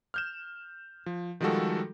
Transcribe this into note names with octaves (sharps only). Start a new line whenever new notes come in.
F6 G6 E7
F3
D#3 F3 G3 G#3 F#4 A4